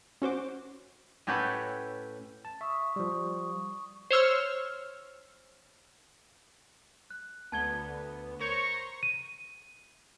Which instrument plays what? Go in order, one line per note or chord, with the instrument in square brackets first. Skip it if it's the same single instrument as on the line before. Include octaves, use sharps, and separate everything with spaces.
[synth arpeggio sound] C#4 F#4 C5 D6
[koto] A2 C#4 F#4 G4 A4 B4
[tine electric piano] A5
[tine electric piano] E5 [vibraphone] C#6 D#6
[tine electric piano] F3 G3
[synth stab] C5 C#5 E6 F6
[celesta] F#6
[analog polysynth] D2 B3 [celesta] A5 G#6 G7
[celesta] A#4 [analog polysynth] C5 C#5 A#5 [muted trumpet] C#6
[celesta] D#7